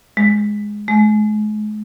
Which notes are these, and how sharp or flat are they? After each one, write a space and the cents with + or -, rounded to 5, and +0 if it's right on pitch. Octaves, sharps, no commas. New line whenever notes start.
G#3 +0
G#3 +40